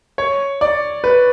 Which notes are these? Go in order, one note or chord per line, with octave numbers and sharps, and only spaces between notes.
C#5
D5
B4